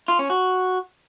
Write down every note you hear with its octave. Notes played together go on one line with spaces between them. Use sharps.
F4
C#4
F#4